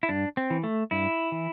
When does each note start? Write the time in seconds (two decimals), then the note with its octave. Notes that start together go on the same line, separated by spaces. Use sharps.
0.03 E4
0.09 G2 D4
0.37 C4
0.50 E3
0.64 A3
0.91 G2 E4
1.32 E3